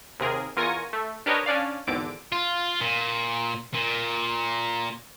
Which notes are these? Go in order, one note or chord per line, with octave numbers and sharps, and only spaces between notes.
D#2 C3 G#4 A#4
E2 F4 A#4 G#5 C#6 A#6
A3
D4 G4 A#4 B4 C#5 D#5
C#4 D4 D5 F5
G#1 E2 D3 D6 D7
F4
A#2
A#2